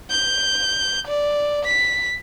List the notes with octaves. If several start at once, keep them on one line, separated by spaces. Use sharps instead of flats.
G6
D5
B6